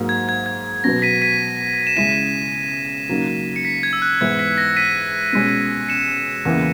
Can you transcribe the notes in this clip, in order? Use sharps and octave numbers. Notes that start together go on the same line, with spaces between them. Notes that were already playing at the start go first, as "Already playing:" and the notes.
Already playing: G#2 F#3 A#3
G#6
G#6
G#6
B2 F#3 B3 A#6
B6 D#7
B6 D#7
E7
C#3 G#3 C#4 E4 B6 D#7
C#3 F#3 A#3 D#4
C#7
B6
G#6
E6
F#6
G#2 E3 G#3 B3 E4 G#6
B6
A#6 C#7
B6 D#7
B2 G#3 C#4
C#7 E7
E2 C#3 E3 A#3